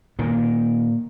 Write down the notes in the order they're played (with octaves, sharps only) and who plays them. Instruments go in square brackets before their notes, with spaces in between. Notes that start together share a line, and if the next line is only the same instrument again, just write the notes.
[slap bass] A#2 D#3